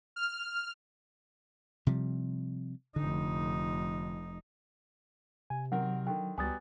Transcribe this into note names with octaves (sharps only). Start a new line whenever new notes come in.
F6
C3 F3 G3
F1 D3 D#4
C3 G#5
D#3 F#3 C4 A#4 F#5
D3 D#3 G5
C#2 F#3 G3 B3 G#5 D#6 A6